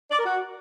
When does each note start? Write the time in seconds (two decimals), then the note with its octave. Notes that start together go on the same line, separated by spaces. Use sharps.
0.11 D5
0.18 A#4
0.26 F#4